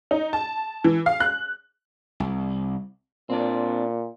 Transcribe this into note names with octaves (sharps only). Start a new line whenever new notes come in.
D#4
A5
E3
F5
F#6
C2
A#2 C4 D4